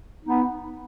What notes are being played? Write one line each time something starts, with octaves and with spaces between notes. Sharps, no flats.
B3 D#4